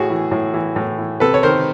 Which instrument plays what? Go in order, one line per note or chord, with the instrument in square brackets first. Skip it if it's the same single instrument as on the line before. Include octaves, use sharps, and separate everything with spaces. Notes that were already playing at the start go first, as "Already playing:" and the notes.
Already playing: [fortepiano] A2 F#4 G#4
E3
A2
E3
A2
E3
C3 A4 B4
C#5
D#3 A#4 C5